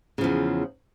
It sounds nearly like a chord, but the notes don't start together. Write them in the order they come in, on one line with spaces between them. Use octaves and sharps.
C#3 F3 E2